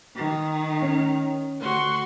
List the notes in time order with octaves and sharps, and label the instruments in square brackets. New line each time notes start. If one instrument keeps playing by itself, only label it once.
[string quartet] D#3
[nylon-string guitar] C#4
[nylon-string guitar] D2 [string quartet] F#4 C6 C#6